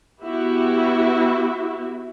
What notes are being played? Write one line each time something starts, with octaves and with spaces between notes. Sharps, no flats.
B3 E4 F#4 G4 E5